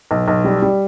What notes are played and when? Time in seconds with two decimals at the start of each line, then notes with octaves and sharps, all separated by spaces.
0.11 B1
0.28 B1
0.45 G3
0.62 G3